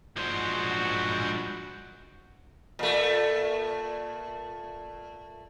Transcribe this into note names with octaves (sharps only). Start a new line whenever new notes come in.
F3 G#3 D4 F#4 C5
A#2 A3